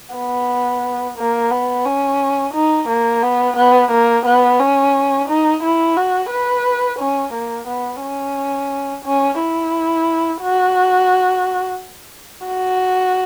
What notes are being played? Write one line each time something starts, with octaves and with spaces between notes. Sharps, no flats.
B3
A#3
B3
C#4
D#4
A#3
B3
B3
A#3
B3
C#4
D#4
E4
F#4
B4
C#4
A#3
B3
C#4
C#4
E4
F#4
F#4